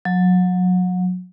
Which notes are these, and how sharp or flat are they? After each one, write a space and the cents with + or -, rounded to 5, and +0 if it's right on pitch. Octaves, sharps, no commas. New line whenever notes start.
F#3 -30